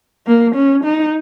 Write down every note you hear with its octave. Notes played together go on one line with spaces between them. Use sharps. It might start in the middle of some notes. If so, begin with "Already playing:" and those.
A#3
C#4
D#4